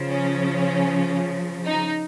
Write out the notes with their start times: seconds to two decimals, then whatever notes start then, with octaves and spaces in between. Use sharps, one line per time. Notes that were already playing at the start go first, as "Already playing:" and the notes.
Already playing: C#3 F3
0.08 C#4
1.66 D#4